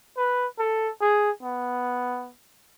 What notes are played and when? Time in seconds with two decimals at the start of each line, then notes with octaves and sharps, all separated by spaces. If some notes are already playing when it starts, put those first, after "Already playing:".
0.17 B4
0.59 A4
1.01 G#4
1.42 B3